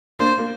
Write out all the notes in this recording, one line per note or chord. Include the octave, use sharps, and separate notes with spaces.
A#3 D4 C5
A#3